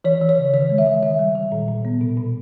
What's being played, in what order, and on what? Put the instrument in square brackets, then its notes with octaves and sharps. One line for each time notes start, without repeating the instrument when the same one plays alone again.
[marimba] E3 C#5
E3
C#5
C#3
D#3 C#5
G#3
E5
D#3
D#3 E5
G3
D#3
A#2
A#2
B3
B2
B2